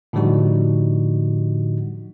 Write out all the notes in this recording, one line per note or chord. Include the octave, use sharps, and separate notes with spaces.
A2 D3 F3 G3 D#4 F#4